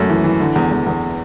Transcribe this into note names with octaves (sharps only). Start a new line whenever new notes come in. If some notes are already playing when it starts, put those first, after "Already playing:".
Already playing: F#2 A3
E3
E3
D3
E2
E2
E2